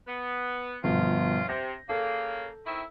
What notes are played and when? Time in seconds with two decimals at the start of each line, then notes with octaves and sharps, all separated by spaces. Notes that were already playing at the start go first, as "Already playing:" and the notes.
0.08 B3
0.84 G1 B2 F3 C4 C#4 F4
1.49 C3 G6 A#6
1.89 C#3 A#3 A4
2.66 D#3 C4 E4